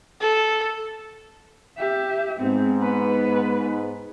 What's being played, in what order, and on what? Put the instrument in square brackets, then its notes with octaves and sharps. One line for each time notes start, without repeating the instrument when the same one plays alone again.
[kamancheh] A4
[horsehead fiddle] G4 E5
[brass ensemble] G#2 [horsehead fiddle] B3 C4
[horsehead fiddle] B3 B4